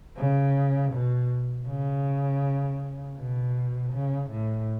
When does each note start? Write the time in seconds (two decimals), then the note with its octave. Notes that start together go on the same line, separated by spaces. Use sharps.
0.17 C#3
0.93 B2
1.67 C#3
3.17 B2
3.93 C#3
4.30 A2